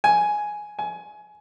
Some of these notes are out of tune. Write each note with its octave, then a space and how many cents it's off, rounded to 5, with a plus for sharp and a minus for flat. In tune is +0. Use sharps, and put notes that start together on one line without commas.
G#5 +5
G#5 +20